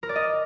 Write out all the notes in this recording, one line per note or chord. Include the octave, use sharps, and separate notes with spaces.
A#4
D5
D#5